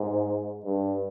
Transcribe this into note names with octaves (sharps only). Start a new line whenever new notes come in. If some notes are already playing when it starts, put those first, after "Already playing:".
Already playing: G#2
G2